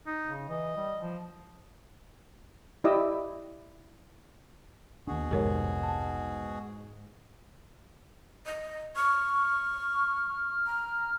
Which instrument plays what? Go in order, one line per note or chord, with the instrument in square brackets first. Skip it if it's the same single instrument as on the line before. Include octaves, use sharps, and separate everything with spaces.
[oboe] D#4
[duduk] C#3
[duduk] E3 [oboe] D#5
[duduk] G3
F3
[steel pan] E4 G4 D5 D#5 D6 E6
[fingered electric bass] D#2 D4 [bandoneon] B2 F#4 G#4
[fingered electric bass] F1 C2 F2 [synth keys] G#2 [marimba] G4 A#4 C#5
[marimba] A5
[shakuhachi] D#5
[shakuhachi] C#6 [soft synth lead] F6
[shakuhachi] A#5